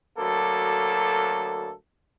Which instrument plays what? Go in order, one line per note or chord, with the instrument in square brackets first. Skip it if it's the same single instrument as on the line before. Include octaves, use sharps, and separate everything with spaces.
[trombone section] D2 F#3 A#3 A4